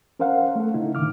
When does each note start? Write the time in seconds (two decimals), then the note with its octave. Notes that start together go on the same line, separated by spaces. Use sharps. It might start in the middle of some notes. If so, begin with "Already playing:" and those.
0.19 C#4 A#4 C5 F5 F#5
0.56 A3 A4
0.74 C#3 D#4 E4
0.95 A2 D3 D#3 D6 F6